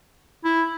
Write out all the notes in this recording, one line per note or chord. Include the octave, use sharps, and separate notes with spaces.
E4